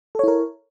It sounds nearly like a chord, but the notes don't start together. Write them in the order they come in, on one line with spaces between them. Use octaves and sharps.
A4 C#5 E4 A#4